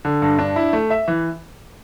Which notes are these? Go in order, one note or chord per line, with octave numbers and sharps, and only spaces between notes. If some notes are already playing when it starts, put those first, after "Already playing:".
D3
G2
D4
E4
A3
E5
E3